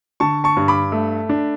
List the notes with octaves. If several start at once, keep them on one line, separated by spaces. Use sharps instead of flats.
D3 A5 C#6
A5 C#6
G2
B5 D6
A3
D4